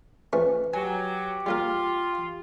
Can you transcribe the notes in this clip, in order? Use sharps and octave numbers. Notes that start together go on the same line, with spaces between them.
F3 A3 C#4 B4
F#3 G4 G#5
G3 A#3 F4 A#4